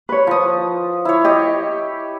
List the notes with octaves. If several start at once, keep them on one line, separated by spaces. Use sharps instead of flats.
B4 C#5
F3 D#6
E4 C#5
G4 D#5